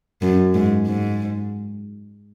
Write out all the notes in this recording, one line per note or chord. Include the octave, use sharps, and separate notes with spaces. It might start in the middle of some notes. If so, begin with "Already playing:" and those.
F#2
G#2
G#2